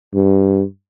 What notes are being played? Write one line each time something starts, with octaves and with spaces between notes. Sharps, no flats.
G2